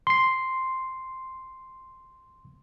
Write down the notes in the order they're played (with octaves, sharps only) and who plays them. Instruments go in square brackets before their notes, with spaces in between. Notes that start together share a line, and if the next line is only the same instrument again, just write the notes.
[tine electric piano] C6 C7